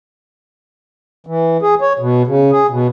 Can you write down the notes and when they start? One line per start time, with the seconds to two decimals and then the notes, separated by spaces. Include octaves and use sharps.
1.27 E3
1.62 G#4
1.81 C#5
1.99 B2
2.27 C#3
2.51 G#4
2.70 B2